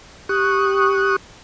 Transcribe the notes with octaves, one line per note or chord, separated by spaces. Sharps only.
G4 C#6 D#6 F#6